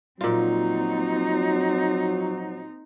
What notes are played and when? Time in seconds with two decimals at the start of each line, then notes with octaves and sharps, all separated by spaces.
0.21 A#2 F3 F#3 C4 D#4 F4